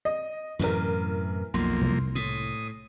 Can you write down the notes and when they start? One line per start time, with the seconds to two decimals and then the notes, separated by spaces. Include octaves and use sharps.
0.05 D#5
0.59 F#2 A2 C3 E3 A#4
1.54 B1 F2 A#3 C6
1.82 C2
2.15 A2 D#6